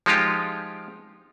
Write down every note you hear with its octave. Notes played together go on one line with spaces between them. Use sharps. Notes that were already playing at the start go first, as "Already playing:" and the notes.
F3 G#3 D#4 F4 G4